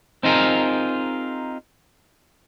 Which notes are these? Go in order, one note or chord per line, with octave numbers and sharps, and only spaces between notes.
C4 D#4 F4 G#4 A#4